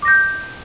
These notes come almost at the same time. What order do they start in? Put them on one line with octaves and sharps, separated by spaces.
D6 A#6 G6